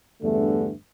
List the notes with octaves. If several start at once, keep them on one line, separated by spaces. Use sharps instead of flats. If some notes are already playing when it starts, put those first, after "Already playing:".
E2 G2 D3 E3 A3